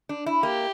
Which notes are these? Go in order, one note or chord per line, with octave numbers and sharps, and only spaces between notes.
D4
E4
A#3 G4